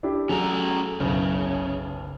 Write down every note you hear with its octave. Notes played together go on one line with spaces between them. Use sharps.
D4 E4 G4
F#3 C#4 G#4 A4 A#5
F#1 B1 C#3